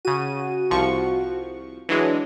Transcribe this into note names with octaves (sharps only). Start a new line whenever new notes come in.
C#3 F#4 D#7
C2 F3 C#6
E3 F#3 G#3 D4